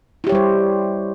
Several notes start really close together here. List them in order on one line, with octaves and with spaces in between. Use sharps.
E4 G4 C#5 G3 C5